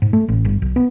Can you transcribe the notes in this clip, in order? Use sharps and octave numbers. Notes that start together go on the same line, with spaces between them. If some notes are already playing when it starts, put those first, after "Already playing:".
G#2
A3
A1
G1
B1
B3